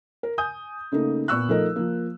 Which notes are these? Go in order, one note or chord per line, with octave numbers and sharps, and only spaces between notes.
A#4
G#5 D#6 G6
C#3 A3 A#3 D#4
A#2 B3 C#6 E6 F#6
F3 A3 D#4 A#4 D#5
F3 A#3